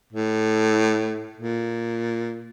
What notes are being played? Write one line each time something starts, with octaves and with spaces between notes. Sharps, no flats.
A2
A#2